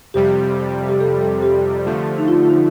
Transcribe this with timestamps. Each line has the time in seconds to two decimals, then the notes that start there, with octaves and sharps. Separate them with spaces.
0.14 F2 C3 G3 G4
0.89 G4
1.00 A4
1.21 A4
1.42 G4
1.85 D3 F3 A3
2.18 D#4
2.28 F4
2.43 F4
2.49 D#4